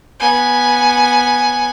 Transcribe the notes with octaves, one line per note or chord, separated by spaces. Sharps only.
B3 G#5